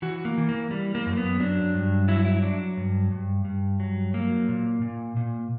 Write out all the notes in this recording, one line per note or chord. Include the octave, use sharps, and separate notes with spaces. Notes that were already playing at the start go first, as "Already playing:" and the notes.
E3 F#4
A#3
E3
A#3
E3 G3
A#3
F#2
B3
F#3 D4
G2
F#3 E4
E4
F#3 D4
G2
G2
G2
F#3
F#3 A#3
A#2
A#2
A#2